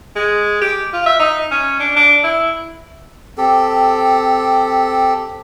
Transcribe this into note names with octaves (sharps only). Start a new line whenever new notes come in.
G#3
G4
F4
E5
D#4
C#4
D4
D4
E4
C4 G4 A4